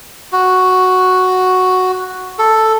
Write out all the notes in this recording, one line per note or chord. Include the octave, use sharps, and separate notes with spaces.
F#4
A4